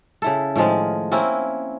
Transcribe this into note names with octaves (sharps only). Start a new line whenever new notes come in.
C#3 E4 A4
A2 D#3 F3 G#3
A#3 C4 C#4 E4